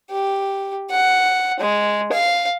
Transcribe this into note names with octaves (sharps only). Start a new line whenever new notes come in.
G4
F#5
G#3
F5